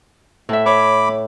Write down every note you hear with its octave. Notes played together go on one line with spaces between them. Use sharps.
A2 E5
C#5 B5 D6